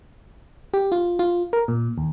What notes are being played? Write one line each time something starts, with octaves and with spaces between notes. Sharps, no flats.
G4
F4
F4
A#4
A#2
D#2